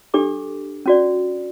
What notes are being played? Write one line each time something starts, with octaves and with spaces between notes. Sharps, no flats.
D4 G4 A4 D6
C#4 F#4 D5